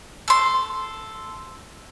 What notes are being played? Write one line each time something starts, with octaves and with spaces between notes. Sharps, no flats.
A4 C6